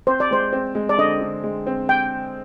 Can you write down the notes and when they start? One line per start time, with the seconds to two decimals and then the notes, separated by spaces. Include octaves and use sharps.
0.07 C4 C5
0.20 D5
0.31 G#3 C5
0.53 C4
0.75 G#3
0.89 D5
0.98 D3 D#5
1.21 D3
1.44 G#3
1.67 C4
1.89 G5